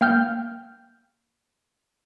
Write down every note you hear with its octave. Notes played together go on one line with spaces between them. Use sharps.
A#3 G5 F6 G6